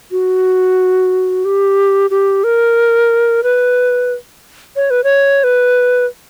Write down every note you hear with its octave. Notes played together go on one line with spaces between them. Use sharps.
F#4
G4
G4
A#4
B4
C#5
B4
C#5
B4